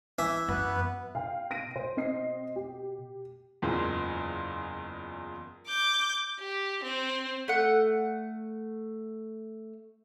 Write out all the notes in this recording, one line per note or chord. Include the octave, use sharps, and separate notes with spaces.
E3 E5
F#2 B3 B4
B2 F5 G5
A#6 D7 D#7
B2 C5
C4 D#5 C7
G4
F#1 E2 A#2 G#3 C6
D6 G6
G4
C4
A3 F#5